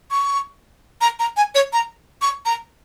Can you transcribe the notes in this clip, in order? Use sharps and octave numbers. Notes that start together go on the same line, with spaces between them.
C#6
A#5
A#5
G#5
C#5
A#5
C#6
A#5